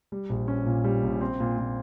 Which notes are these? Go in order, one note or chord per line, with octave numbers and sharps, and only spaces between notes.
G3
A#1
C#4
A#2
G3
A#1
C4
A#2
A#2